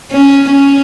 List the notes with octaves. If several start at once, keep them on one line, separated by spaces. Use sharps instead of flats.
C#4
C#4